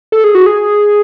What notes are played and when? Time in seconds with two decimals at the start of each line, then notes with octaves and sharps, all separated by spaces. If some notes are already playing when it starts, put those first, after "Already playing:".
0.12 A4
0.24 G#4
0.35 F#4
0.46 G#4